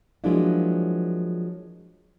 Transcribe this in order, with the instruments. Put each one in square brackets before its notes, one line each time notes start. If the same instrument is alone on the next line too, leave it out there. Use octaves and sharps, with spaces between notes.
[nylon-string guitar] F3 F#3 G#3 A#3 D4 E4